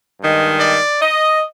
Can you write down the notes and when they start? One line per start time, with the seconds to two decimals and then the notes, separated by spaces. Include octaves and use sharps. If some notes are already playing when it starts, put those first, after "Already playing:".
0.21 G2 D#3 G#3
0.60 D5
1.00 D#5